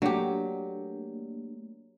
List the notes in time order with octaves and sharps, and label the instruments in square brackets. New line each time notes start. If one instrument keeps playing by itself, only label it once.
[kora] F#3 G4 [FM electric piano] A3 A#3 D4